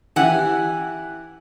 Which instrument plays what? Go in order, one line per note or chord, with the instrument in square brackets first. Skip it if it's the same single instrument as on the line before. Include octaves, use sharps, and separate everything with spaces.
[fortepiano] E3 E4 G4 [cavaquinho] F#5 G#5